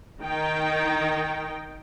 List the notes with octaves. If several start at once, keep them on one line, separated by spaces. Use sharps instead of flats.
D#3 D#4 G5